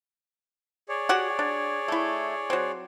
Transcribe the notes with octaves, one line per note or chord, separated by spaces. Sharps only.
G#4 C#5 D5
F#4 G4 F#5
D4
A3 E4
F#3 C4